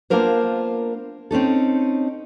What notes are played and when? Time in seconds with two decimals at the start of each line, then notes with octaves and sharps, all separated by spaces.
0.10 A#3 B3 D4 F4 A#4 C5
1.31 C4 C#4 D#4 A4